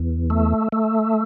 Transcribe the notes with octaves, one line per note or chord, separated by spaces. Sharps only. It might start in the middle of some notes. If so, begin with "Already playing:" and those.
Already playing: E2
A3
A3